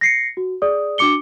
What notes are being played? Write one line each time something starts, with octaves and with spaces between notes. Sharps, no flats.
A#6 C7 C#7
F#4
G#4 D5 D#6
D4 F#4 D6 C#7 G7